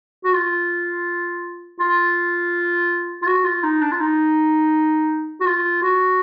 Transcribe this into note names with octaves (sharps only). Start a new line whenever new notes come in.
F#4
F4
F4
F4
F#4
F4
D#4
D4
F4
D#4
F#4
F4
F#4